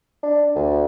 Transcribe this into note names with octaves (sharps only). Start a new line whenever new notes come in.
D4
D2